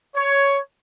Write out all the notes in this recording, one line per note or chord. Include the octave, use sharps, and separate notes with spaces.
C#5